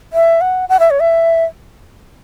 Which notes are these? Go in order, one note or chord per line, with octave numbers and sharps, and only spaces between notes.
E5
F#5
F#5
E5
C#5
E5